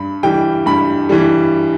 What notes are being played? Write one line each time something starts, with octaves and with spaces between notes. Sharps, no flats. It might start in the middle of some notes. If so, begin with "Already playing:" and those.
Already playing: G2 B5
E3 G3 G5
G2 B5
E3 G3